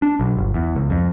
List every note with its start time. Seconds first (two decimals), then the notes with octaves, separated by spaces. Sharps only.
0.02 D4
0.20 B1
0.37 G1
0.54 E2
0.75 C#2
0.90 F2